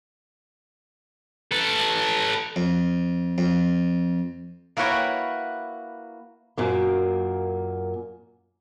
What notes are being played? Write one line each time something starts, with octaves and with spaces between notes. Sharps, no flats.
A4 B4
F2
F2
A#3 E4 F#4 B4 C#5 G5
F#2 A#2 A#3